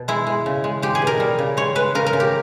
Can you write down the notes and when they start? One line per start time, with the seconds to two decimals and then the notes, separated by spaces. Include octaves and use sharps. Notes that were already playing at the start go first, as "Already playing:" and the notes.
Already playing: B2
0.08 G#3 E4
0.27 G#3
0.46 C#3
0.64 G#3
0.82 G#3 G4
0.95 G#4
1.02 B2
1.07 A#4
1.20 G3
1.39 C#3
1.57 G#3 C#5
1.75 G#3 B4
1.95 C#3 A#4
2.06 A#4
2.13 C#3
2.20 G4